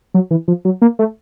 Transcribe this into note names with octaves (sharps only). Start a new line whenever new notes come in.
F#3
E3
F3
F#3
A#3
A3